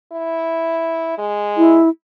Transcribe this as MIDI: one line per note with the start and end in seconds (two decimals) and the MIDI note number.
0.12 1.17 64
1.18 1.80 56
1.57 1.89 64